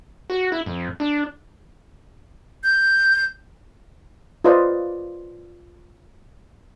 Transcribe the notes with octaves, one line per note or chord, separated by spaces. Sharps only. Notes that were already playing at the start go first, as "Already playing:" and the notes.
F#4
E4
F2
D4
G6
F4 B4 C5 D5 D#5